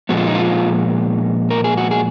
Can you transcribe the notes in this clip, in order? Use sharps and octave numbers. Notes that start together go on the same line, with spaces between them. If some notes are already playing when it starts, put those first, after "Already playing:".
A#2 F3 G#3 B3 F#4
F4
D#4
F4
A#4
G#4
F#4
G#4